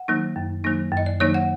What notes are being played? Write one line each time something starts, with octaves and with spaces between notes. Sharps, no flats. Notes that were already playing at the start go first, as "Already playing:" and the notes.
Already playing: F#5
D#3 F#3 A#3 D#4
F#2
D#3 F#3 A#3 D#4
F#2
D#5
D5
D#3 F#3 A#3 D#4 C#5
F#5